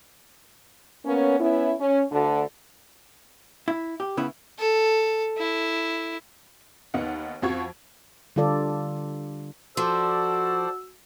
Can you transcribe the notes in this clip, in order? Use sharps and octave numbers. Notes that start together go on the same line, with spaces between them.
A#3 B3 C#4
B3 C#4 E4
C#4
D2 D3
E4
G4
C#3 B3 E4
A4
E4
D#2 B3 D#4 F#5
F2 F3 F#4 C#6 G#6
D3 G3 F4 A4 D5
F3 F#4 A4 C5 D5 E6